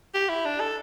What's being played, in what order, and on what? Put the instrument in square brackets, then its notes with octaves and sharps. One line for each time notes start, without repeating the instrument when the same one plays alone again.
[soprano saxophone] G4
E4
D4
A4